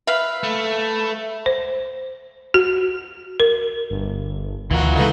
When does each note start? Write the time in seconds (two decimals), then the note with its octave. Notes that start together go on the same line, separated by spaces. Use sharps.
0.07 B4 E5 F5 B5
0.43 A3
1.46 C5
2.54 F#4
3.40 A#4
3.90 G1
4.71 D2 D#3 E3 F4 F#4 A#4
4.96 C#3 F3 G#3 D#4 F4 A4 B4